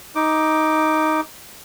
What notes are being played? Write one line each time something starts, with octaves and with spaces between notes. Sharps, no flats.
D#4 D6